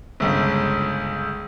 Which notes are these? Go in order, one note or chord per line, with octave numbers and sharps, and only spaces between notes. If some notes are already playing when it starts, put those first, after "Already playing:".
G1 C#2